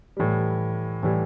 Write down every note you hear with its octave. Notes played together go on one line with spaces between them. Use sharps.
A2 E3 G3
A2 E3 G3